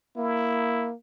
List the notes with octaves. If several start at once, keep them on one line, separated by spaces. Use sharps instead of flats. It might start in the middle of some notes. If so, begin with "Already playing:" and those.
A#3 E4